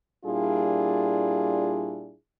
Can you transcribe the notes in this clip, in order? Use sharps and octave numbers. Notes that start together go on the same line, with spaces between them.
A#2 G3 D4 E4 F4 G#4